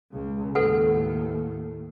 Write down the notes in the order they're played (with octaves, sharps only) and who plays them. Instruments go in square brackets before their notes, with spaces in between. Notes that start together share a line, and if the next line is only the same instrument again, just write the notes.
[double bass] C#2 C#3
[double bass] D#2 A2 [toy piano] A4 B4 F#5